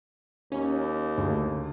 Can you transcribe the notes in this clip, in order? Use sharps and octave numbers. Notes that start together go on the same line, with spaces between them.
D#2 C#4
D2 C#3